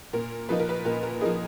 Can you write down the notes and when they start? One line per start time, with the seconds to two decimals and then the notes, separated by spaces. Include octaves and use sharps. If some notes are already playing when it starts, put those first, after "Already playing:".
0.13 A#2 A#4
0.49 F3 A#3 D#4 B4
0.59 A#4
0.69 B4
0.85 A#2 A#4
1.03 A#4
1.21 F3 A#3 D#4 G#4